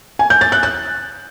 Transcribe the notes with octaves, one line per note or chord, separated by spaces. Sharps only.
G#5
G6
A6
F#6
F#6